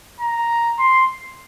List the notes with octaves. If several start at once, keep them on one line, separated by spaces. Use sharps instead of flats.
A#5
C6